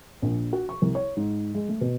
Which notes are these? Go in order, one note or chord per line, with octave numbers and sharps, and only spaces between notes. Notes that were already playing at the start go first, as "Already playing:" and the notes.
A#1
F#4
C#6
C2
C#5
G#2
G#3
A3
B2